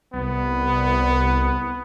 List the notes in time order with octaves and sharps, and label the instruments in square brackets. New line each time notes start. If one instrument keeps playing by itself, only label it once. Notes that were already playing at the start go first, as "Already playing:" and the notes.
[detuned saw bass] C2 [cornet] B3